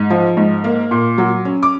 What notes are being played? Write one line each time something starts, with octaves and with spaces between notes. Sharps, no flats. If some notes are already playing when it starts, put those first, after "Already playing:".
Already playing: G#2
F3
G#2
A#3
A#2
F#3
C#4
D6